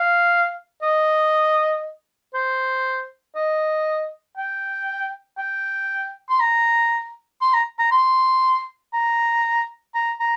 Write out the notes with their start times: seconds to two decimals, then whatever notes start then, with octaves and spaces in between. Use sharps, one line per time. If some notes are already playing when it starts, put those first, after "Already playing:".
Already playing: F5
0.82 D#5
2.34 C5
3.35 D#5
4.37 G5
5.38 G5
6.29 C6
6.40 A#5
7.41 C6
7.53 A#5
7.79 A#5
7.91 C6
8.93 A#5
9.94 A#5
10.20 A#5